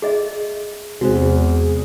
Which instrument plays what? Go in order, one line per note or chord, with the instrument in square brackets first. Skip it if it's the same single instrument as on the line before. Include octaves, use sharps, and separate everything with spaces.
[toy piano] G#4 D#5 E5
[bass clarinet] E2 [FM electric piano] C3 G#3 G#4 [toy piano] F#4 C5